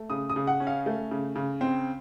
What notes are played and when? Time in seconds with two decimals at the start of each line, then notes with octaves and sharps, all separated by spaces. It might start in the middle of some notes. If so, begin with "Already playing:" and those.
Already playing: A3
0.10 C#3 D#6
0.30 D#6
0.36 C#3
0.47 F#5
0.60 C#4
0.67 F5
0.86 A3
1.11 C#3
1.36 C#3
1.61 C4